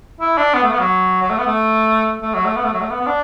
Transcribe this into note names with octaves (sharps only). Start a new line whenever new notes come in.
E4
D4
B3
A3
B3
F#3
F#3
A3
B3
A3
A3
F#3
A3
B3
A3
F#3
A3
B3
B3
D4